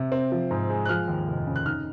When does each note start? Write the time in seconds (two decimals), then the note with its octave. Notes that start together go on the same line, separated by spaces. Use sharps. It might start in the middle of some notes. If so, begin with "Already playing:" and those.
Already playing: C3
0.12 C4
0.32 F3
0.51 G#2
0.70 G#3
0.85 F#6
0.89 F3 F6
1.08 D#2
1.28 F1
1.47 C#3
1.56 F#6
1.66 D#4 F6